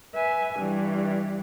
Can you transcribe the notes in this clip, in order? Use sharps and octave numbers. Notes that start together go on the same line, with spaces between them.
B4 E5 G#5
G2 E3